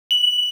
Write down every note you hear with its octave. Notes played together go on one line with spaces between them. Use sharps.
F#7